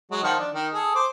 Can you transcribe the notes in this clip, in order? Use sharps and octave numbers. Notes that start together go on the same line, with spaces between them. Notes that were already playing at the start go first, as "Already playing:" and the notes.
F#3 G#3
D#3 F3 F#5
D4
D#3
G#4 A4
C5 D6